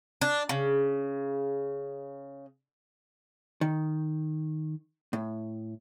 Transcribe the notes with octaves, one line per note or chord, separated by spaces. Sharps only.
D4
C#3
D#3
A2